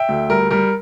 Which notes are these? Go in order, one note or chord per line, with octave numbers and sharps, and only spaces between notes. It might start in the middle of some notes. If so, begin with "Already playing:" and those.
Already playing: E5 G5
D2
G3 A#4
G3 A#4